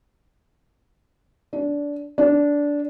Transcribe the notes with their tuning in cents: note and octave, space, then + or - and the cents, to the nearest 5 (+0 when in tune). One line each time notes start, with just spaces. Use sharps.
D4 -20
D4 -15